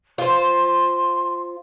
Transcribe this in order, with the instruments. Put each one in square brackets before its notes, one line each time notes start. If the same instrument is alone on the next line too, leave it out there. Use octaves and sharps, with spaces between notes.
[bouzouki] F4 C5 [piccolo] C6